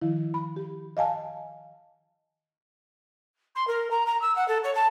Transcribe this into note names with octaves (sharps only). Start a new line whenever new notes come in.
D#3 F3 E4
B5
G4
D#5 F5 G#5 A5
C6
A#4
A#5
A#5
E6
F#5
A4
C#5
A5